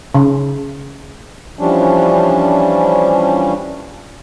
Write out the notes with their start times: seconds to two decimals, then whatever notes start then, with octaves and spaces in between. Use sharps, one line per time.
0.15 C#3
1.59 E3 F3 G3 C#4 D4